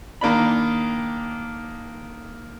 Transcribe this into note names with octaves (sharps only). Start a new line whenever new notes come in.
D#3 A#3 D4 B5